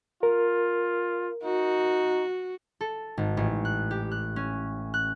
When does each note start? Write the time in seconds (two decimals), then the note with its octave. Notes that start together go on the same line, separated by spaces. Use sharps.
0.23 F4 A#4
1.44 D#4 F#4
2.81 A4
3.17 G#1
3.37 A1
3.65 F#6
3.91 G4
4.11 F#6
4.36 C#4
4.94 F#6